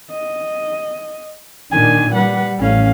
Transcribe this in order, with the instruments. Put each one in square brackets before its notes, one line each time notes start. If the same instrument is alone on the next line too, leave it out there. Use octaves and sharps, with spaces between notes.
[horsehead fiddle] D#5
[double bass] A#2 D#3 [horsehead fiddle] D4 G#5
[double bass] G3 [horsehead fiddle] B4 F#5
[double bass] A1 [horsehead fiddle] C#4 F5